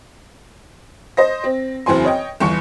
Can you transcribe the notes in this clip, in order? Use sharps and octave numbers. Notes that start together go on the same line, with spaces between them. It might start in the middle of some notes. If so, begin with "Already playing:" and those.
C5 D#5 A#6
C4
F#1 E2 E3 C4 G#5 C6
C#5 D#5 G5
G1 E2 C#6 C#7